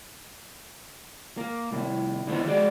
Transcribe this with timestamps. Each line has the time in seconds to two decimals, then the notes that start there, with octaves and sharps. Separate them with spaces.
1.37 A#3
1.71 C2 A2
2.27 D3 E3 A3 B3 C5
2.46 G#3 F#4 D5